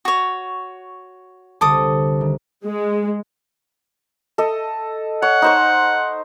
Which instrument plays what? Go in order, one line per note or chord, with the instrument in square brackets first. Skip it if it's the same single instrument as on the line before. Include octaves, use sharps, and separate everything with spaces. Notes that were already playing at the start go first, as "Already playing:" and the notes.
[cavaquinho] F#4 C#5
[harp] C2 D3 [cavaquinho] A4 D6 D#6
[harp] D#3
[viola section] G#3
[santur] A4 D#5
[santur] C#5 [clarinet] F#5
[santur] D#4 C5 C#6